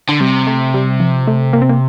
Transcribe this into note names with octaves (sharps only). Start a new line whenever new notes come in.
D3
C3 G3
A3
G3
F3
A3
A#3
C4
A#3